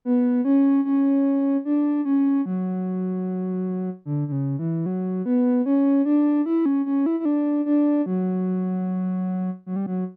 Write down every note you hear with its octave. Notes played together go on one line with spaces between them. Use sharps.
B3
C#4
C#4
D4
C#4
F#3
D3
D3
C#3
E3
F#3
B3
C#4
D4
E4
C#4
C#4
E4
E4
D4
D4
F#3
F#3
G3
F#3